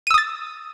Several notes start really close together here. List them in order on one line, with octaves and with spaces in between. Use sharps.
D#7 E6 D#6 A6